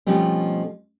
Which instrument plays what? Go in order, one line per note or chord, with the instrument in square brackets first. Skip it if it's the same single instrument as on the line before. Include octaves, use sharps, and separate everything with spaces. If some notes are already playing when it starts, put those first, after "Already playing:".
[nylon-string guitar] B2 F3 G3 A3 C4 C#4